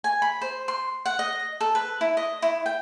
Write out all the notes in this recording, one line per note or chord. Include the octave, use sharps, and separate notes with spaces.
G#5
B5
C5
C6
F#5
D#5
A4
B4
E4
D#5
E4
G5